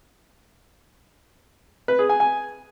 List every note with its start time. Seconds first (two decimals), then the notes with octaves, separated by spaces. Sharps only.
1.88 B4
1.99 G#4
2.09 G#5
2.20 G#5